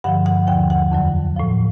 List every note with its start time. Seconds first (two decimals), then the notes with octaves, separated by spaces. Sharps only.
0.04 G2 D3 F3 F#5
0.26 F#5
0.47 D#2 D3 F3 G5
0.70 F#5
0.91 F2 D3 F#3
1.36 A2 F3